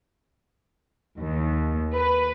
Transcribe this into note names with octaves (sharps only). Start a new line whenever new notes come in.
D#2
B4